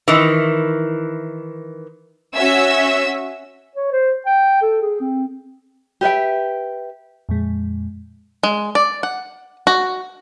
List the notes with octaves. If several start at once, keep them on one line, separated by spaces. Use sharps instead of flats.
D#3 E3
C#4 F#4 E5 E6
C#5
C5
G5
A4
G#4
C4
G4 B4 E5 G5
F2 A#2 G#3
G#3
D5
F#5
F#4